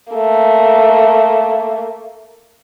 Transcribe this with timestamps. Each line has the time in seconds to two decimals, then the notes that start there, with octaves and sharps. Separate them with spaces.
0.13 A3 A#3